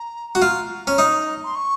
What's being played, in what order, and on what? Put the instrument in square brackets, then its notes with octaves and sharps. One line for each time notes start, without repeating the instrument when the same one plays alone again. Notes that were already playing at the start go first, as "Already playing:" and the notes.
Already playing: [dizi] A#5
[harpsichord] F#4
[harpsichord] F4 [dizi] A#5
[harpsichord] C#4
D#4
[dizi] C6
C#6